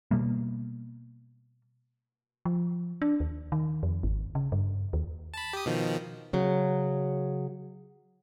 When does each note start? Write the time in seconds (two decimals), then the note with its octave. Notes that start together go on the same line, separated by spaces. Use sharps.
0.11 B2 G3 A#3
2.45 F3
3.02 D4
3.20 D#2
3.52 D#3
3.83 F2
4.03 G#1
4.35 C#3
4.52 G2
4.93 D#2
5.34 A5 B5
5.53 G4 D#6
5.66 B2 D#3 F3
6.33 C#3 F#3